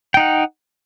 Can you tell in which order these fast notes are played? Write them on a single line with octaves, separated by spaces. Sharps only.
G5 D#4 F#5